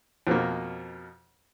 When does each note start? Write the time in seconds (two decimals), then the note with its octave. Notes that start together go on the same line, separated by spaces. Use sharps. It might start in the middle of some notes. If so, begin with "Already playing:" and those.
0.27 F2 B2 F3 A#3